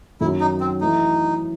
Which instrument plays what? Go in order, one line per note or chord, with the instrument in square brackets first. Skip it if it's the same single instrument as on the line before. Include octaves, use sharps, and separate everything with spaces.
[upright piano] F#2 D#3 F#3 [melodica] E4
[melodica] D#4
C4
[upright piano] E3 A3 [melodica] D#4